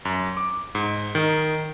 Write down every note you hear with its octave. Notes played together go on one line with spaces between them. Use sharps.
F#2
D6
G#2
D#3